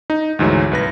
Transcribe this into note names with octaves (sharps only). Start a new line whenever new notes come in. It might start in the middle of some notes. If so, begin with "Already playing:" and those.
D#4
D2 G#2 E3 F#3
C2 B4 A#6